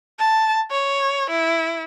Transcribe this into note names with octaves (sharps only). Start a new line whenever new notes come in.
A5
C#5
E4